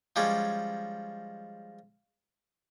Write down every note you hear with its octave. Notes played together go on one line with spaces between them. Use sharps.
F3 G3 G#3 C#4